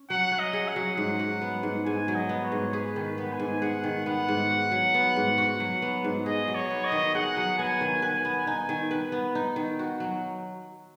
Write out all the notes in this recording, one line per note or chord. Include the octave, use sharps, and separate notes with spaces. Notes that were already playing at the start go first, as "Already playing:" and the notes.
Already playing: C#4
F#3 F#5
C#4
D#5
G#4
F#5
F#3
G#2
F#3
B3
G#2
G#2 G#5
F#3
D#5
B3
C#5
G#2
G#4 B4
D#3
B4
B3
G#5
G#2
G#4 F#5
D#3
B3 F#5
G#2
F#4
F#3
B3
G#2
F#4
F#3
B3
G#2
G#4 D#5
F#3
C#5
B3
D#5
D#3
G#4 F#5
F#3
B3 G#5
D#3
B4 G#5
B3
D#4 G#5
D#3
B4
B3
D#4
D#3
F#4
F#3